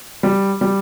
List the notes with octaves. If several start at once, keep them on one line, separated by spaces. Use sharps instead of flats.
G3
G3